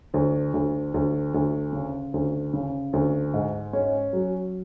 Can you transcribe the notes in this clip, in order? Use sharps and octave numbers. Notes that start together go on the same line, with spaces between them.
D2
D2
D2
D2
C#3
D2
C#3
D2
G#2
C#4
F#3